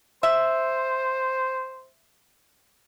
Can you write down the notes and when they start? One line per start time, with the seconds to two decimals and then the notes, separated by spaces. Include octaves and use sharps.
0.23 C5 E5